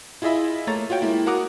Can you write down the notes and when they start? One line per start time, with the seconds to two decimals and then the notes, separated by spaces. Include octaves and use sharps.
0.22 E4 F4 G#4 D#5 E5 B5
0.67 A3 A#3 C#5 A#5 A6
0.90 F4 F#4 C#5 G5
1.02 G#3 A#3 E4
1.27 F#4 A#4 F#5 A#5 D6 D#6